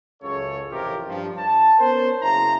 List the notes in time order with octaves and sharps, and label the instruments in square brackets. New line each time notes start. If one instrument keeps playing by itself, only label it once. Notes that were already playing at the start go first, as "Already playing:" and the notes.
[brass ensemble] C#2 F#2 C#3 A4 C#5
A1 F2 C3 F4 G4 A#4
G2 F3
A5
B3 C#4 A#4 C5
F#1 C#3 E4 A#5